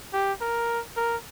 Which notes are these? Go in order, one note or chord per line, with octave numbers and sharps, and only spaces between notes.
G4
A#4
A#4